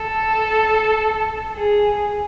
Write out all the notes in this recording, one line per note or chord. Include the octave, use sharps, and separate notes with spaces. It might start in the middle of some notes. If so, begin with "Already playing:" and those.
Already playing: A4
G#4